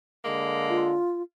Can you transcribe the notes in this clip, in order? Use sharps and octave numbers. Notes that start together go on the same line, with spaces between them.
D3 G#3 A#3
F4